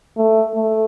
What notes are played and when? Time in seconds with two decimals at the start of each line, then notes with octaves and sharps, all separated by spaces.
0.17 A3
0.54 A3